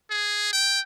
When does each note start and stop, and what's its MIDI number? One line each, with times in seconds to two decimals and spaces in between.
0.10 0.51 68
0.53 0.80 79